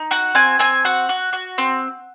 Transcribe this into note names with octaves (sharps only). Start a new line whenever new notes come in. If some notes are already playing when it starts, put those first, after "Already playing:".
Already playing: D#4
F#4 F#5
C4 G#5
C4 G#5
F#4 F#5
F#4
F#4
C4